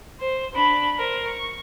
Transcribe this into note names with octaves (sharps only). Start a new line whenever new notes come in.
C5
D4 B5
A#4 C5
C#6